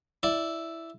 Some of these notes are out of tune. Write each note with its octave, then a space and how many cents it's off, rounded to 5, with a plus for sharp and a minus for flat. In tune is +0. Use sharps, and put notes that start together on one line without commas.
E4 +0 D5 +0